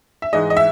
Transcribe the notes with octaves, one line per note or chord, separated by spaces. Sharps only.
E5
G#2 E3 G#3 D#5
D#5
E5